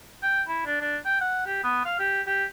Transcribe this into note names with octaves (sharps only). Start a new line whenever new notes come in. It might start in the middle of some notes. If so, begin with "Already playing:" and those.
G5
E4
D4
D4
G5
F#5
G4
B3
F5
G4
G4